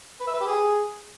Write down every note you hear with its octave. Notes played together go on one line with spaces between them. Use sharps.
B4
E5
B4
G4
G#4